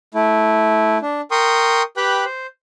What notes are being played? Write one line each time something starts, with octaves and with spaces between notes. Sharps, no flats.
A3 E4
D4
A#4 G5 C6 C#6 D#6
G4 B4 G5 B5 F#6
C5